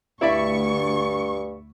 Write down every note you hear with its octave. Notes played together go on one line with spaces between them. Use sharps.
D2 G2 E4 D5 E5 C#6